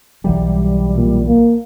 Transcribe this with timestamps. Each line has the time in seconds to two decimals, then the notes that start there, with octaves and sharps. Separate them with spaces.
0.24 B1 E3 F#3 G3
0.96 A#2
1.27 A#3